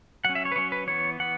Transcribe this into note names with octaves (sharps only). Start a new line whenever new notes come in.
F#3 C#4 F#5
E5
C#5
B4
F#3 C#4 C#5
B4
E3 B3 C#5
E3 B3 F#5